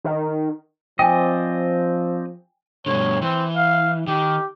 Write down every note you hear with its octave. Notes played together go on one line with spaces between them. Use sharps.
D#3
F3 C4 D5 D#5 G5 G#5
G2 B2 D3 C#5
E3 C4
F5
D#3 G4